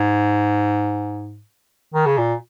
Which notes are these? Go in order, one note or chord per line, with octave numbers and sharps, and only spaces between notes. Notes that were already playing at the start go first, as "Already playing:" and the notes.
Already playing: G#2
D#3
C#3
A#2